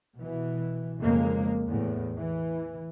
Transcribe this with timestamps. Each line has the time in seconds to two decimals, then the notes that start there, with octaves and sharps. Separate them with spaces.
0.16 B2 E3
1.00 F2 C#3 G#3 A#3
1.67 E2 A2
2.18 E3